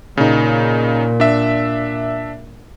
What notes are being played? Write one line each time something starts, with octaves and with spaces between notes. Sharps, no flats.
A#2 C#3 D#4
D4 E5